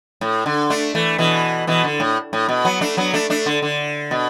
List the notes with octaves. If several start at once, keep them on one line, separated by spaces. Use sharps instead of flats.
A2
D3
A3 D4
E3 A3
B2 E3
B2 E3
D3
A2
A2
B2
F#3 B3
A3 D4
F#3 B3
A3 D4
A3 D4
D3
D3
B2